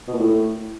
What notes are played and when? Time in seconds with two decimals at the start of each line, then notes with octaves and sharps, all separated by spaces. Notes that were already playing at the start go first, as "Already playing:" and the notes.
0.08 B2
0.13 A#2
0.19 A2